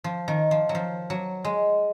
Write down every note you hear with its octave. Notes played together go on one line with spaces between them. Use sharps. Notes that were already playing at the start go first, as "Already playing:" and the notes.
F3
D#3
F3
F#3
F3
F#3
G#3